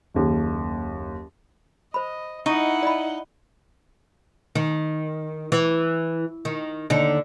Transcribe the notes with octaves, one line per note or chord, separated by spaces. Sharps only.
F#1 D#2
C5 D#5 B5
D#4 E4 F#5 G#5 C#6 D#6
D5 D#5 B5
D#3
E3
D#3
D#2 D3 D#4